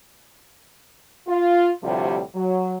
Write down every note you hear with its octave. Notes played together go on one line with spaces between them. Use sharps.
F4
D2 A2 C3 F3 G3 G4
F#3